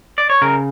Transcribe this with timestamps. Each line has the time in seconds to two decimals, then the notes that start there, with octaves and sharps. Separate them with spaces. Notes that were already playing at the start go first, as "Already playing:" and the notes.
0.18 D5
0.30 C#5
0.42 C#3 A#4